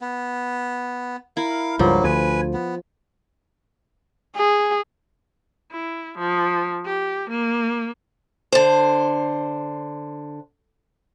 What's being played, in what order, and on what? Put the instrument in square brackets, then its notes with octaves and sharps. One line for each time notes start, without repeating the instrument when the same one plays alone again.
[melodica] B3
[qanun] E4 [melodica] A#4 F5
[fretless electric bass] C#2 G2 [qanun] F3 [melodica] F#3 A#3
[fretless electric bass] D2 [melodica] B4 G#5
[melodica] B3
[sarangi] G#4
[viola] E4
F3
G4
A#3
[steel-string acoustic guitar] D3 C5